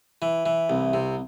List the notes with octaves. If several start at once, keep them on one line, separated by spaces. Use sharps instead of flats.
E3
E3
C2
C3